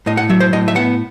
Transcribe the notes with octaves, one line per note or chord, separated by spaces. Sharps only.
A2 D#5
F#5
F#3 E5
C5
A2 D#5
E5
B3 F#5